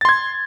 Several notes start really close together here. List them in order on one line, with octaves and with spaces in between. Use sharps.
A6 C6 G#6